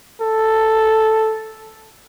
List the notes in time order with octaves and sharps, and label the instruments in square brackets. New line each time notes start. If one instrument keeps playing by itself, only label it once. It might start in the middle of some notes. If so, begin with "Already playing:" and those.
[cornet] A4